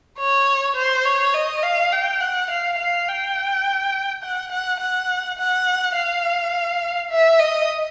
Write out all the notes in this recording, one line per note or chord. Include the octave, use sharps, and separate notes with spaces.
C#5
C5
C#5
D#5
F5
G5
F#5
F5
F5
G5
F#5
F#5
F#5
F#5
F5
E5
D#5